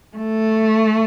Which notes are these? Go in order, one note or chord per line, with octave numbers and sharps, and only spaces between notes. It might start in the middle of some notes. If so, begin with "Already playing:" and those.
A3